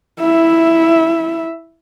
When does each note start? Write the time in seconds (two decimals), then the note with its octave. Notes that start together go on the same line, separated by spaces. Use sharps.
0.20 E4 E5